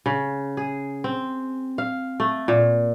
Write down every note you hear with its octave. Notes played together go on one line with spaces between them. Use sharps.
C#3
G#4
C4
F5
A3
A#2